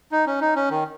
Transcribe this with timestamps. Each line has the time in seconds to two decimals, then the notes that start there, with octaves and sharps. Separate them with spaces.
0.12 D#4
0.26 C#4
0.41 D#4
0.56 C#4
0.70 D#3